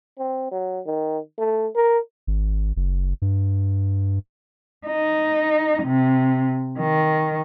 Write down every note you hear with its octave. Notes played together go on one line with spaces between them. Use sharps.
C4
F#3
D#3
A3
A#4
G#1
F#1
G2
D#4
C3
D#3